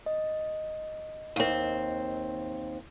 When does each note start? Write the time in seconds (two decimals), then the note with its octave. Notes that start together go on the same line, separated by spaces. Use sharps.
0.06 D#5
1.36 D#2 C4